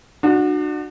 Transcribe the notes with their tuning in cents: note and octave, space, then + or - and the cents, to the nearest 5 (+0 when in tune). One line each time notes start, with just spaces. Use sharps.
D4 +35 F#4 -15